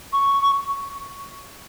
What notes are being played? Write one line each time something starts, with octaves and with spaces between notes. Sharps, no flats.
C#6